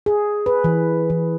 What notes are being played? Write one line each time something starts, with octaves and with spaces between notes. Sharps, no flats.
G#4
B4
E3
E3